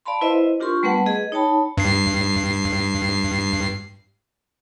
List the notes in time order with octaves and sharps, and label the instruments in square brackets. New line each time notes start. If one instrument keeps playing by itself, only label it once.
[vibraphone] D5 F5 A5 B5 C6
E4 B4 C5 D#5 E5
D4 F4 G4 A#4 C6 C#6
G3 A3 B3 B4 F#5 A5
G#4 B4 D#5
D#4 C#5 G5 A5 B5
[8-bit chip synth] G2 C7